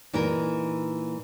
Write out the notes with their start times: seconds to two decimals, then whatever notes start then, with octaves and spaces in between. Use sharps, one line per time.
0.13 A#2 E3 D#4 A#4